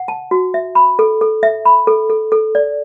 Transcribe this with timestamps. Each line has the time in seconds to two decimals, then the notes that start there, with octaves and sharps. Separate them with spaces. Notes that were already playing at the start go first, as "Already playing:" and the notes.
Already playing: F#5
0.08 A5
0.31 F#4
0.54 E5
0.75 B5
0.99 A4
1.21 A4
1.43 E5
1.65 B5
1.87 A4
2.10 A4
2.32 A4
2.55 D5